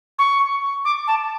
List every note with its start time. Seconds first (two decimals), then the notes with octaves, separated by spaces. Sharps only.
0.18 C#6
0.85 D6
1.07 A5